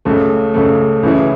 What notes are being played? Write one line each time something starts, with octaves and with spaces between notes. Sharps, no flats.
C#2 C#3 A3
C#2 C#3 A3
C#2 C#3 E3 C#4 E4